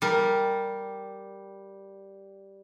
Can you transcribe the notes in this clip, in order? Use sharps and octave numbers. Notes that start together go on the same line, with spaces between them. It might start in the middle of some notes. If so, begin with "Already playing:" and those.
G3 A#4